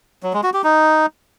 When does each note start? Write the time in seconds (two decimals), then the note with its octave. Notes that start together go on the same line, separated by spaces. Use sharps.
0.23 F#3
0.33 G#3
0.43 F#4
0.54 G4
0.64 D#4